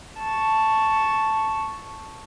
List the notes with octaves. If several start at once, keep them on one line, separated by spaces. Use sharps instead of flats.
A5 C#6